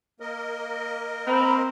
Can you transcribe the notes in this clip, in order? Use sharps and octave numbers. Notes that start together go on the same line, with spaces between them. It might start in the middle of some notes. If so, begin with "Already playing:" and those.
A#3 A#4 D#5
C4 A#5 B5